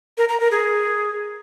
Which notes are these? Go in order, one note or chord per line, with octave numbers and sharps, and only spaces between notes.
A#4
A#5
A#4
G#4